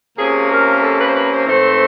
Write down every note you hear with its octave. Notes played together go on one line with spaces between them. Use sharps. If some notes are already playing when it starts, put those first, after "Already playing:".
C3 F3 A#3 C#4 G#4
A#4
A4
B4
C5
B4
C5
G#2 E3 A3 C4 C5